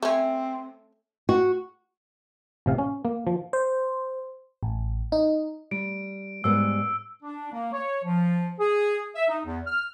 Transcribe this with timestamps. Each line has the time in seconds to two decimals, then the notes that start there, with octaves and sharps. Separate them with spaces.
0.03 A3 C4 C#4
1.29 F#4
2.66 A1 C3 F5
2.78 C#4
3.05 A#3
3.27 F3
3.53 C5
4.63 A1
5.12 D#4
5.71 G3 D7
6.44 G#2 G3 B3 E6
7.23 D4
7.52 A#3
7.73 C#5
8.05 F3
8.59 G#4
9.15 E5
9.29 D#4
9.45 E2
9.66 F6